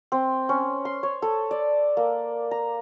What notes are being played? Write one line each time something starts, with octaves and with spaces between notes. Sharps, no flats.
C4
C#4
C6
C#5
A4
D5
A#3
A#5